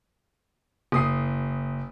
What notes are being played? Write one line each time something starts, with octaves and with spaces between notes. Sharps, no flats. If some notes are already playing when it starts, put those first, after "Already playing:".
F#1 D#6 C7